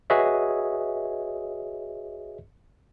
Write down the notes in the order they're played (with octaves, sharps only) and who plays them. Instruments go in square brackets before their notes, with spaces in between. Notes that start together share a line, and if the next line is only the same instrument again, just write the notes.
[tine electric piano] F#4 G#4 B4 C#5 D#5 E5